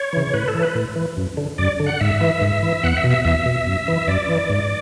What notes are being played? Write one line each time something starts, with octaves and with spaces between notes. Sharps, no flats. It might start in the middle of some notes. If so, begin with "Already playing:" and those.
Already playing: C#5
C#3 E3
A2 B4
A4
E3
B4
A2
E3
F#2
D3
F#2 D5
D3
F#5
G#2 E5
E3
G#2
E3
E2 F#5
E5
B2
E5
E2 E5
B2
F#2
E3
F#2 D5
E3
G#2